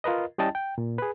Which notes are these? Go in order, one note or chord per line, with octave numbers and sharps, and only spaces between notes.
F4 A#4 B4 D#5
G3 C#4 E4 D#5 G5 A5
G5
A#2
G#4 B4